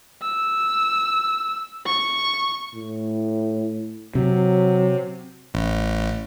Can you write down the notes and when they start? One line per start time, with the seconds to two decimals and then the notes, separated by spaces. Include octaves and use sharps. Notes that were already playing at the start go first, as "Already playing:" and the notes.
0.22 E6
1.86 C#6
2.75 A2
4.15 C3 F#3
5.54 A1